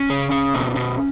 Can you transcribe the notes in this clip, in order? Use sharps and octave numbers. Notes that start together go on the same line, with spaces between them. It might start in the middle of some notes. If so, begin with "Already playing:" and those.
Already playing: C#4
C#3
C#3
B2
B2